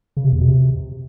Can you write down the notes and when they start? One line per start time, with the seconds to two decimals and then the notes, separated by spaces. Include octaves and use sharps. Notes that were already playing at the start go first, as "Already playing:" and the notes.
0.17 C#3
0.25 C3
0.32 E2
0.40 B2
0.48 C3